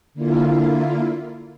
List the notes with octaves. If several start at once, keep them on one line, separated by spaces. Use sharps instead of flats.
D3 A#3 E4 F4